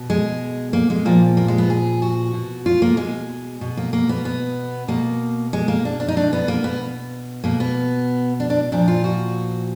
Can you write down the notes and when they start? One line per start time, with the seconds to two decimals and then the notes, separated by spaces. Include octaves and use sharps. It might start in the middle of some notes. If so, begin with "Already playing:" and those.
Already playing: B2
0.10 G#3
0.73 A#3
0.90 G#3
1.05 A#2 F3 A#3
1.37 A#3
1.48 G#3
1.58 B3
1.70 G#4
2.02 F#4
2.33 B2
2.66 F4
2.82 A#3
2.97 G#3
3.61 B2
3.77 A#3
3.93 A#3
4.09 B3
4.25 B3
4.88 B2 A#3
5.53 G#3
5.68 A#3
5.85 D4
6.00 D4
6.08 D#4
6.16 B2 D4
6.33 B3
6.48 A#3
6.64 B3
7.44 B2 A#3
7.60 B3
8.40 D4
8.50 D4
8.72 A#2 F3 D4
8.88 F4
9.04 F#4